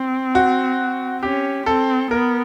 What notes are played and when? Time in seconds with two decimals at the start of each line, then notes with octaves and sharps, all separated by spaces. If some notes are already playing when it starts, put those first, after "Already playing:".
Already playing: C4
0.35 F#4
1.23 C#4 G4
1.66 C4 A4
2.11 B3 A#4